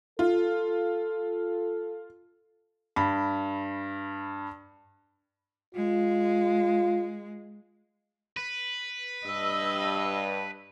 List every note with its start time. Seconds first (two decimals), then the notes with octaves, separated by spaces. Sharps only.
0.19 F4 A4
2.96 G2 B5
5.75 G#3 F4
8.37 B4
9.27 G2 D#5 E6